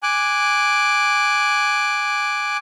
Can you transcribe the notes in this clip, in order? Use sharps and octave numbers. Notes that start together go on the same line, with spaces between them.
G#5 D6 F#6